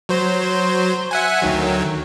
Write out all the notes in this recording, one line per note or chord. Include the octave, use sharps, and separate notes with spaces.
F#3 C5
E5 F#5 G#5
D2 D#3 F#3